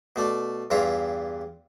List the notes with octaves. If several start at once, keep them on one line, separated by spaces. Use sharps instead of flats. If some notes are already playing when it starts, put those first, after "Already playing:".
B2 A3 D5
E2 G2 E3 F4 E5 A#5